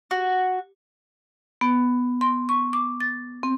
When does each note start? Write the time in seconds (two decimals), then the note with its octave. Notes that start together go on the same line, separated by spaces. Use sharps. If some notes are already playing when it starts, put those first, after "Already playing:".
0.11 F#4
1.61 B3
2.21 C6
2.49 C#6
2.73 D6
3.00 A6
3.43 C4